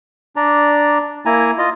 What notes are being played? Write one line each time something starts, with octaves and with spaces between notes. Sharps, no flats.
D4 D5 A#5
A#3 E4 G#5 A#5
F4 D#5